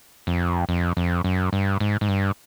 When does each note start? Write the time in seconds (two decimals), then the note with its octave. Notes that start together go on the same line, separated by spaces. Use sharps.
0.27 F2
0.69 F2
0.97 F2
1.24 F#2
1.53 G2
1.80 G#2
2.01 G#2
2.08 G2